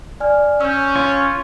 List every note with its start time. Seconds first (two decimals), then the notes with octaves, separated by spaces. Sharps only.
0.20 D5 G#5 F6
0.61 C#4 E6 G6
0.96 F4 C#5